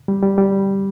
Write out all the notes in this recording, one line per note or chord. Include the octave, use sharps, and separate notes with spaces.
G3
G3
G3